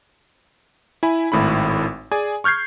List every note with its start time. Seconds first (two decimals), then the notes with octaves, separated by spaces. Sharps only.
1.03 E4 G#5 B5
1.32 G#1 A2 E4 B5
2.11 G#4 D5 G#5
2.44 C#6 F6 G6 G#6 C7